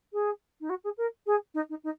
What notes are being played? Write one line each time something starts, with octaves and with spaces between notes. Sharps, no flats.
G#4
D#4
F#4
G#4
A#4
G#4
D#4
D#4
D#4